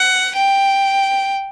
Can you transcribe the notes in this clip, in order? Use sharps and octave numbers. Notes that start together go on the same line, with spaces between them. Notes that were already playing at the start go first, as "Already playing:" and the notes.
Already playing: F#5
G5